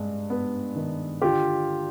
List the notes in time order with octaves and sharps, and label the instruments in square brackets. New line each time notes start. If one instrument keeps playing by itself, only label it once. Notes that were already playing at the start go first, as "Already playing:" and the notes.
Already playing: [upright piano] G2 G#3
B3
D#3
[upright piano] D3 [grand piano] F4 G4